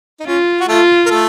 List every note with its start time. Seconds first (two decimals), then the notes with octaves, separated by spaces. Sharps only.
0.20 D#4
0.26 C#4 F4
0.60 F#4
0.68 A3 F4 A4
1.06 A#4
1.10 A3 A4